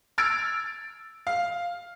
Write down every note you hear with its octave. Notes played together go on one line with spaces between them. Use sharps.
E6 F6 G#6 A6 D7
F5